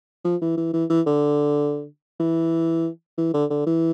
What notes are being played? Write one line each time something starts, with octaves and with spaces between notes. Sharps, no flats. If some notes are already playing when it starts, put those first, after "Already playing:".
F3
E3
E3
E3
E3
D3
E3
E3
D3
D3
E3